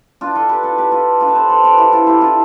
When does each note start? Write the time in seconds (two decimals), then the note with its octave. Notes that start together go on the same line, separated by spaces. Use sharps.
0.21 D4 F4
0.35 F4 A4
0.49 G4 B4
0.63 F4 A4
0.78 G4 B4
0.92 F4 A4
1.20 D4 F4
1.28 B4
1.35 A4 C5
1.50 A4 C5
1.64 B4 D5
1.78 E4 G4
1.92 F4 A4
2.07 E4 G4
2.21 D4 F4